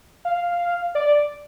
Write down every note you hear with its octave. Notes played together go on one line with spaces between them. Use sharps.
F5
D5